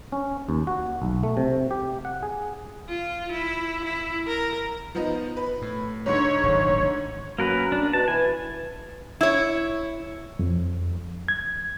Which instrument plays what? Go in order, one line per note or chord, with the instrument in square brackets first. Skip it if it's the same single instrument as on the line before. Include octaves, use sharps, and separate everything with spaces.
[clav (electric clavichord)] C#4
D#2
F#4
B1
A3
C3
G4
F#5
G#4
[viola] F4
E4
E4
A#4
[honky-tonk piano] F3 B3 D#4
B4
[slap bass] A2
[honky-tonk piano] G#2 D3 C#7 [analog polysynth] C#5
[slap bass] D1 G#1 A#2
[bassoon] F#2 [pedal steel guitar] A#3 A#4 B4
[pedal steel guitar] D4
[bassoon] B2 [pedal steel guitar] A5
[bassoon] E3 [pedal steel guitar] G#5
[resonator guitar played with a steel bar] E4 C#5
[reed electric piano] F2
G#6